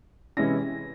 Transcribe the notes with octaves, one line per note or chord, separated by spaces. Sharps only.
C3 E3 G#3 C#4 E4 A#6